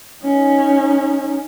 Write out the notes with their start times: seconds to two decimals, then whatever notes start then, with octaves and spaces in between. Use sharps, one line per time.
0.24 C#4 D#4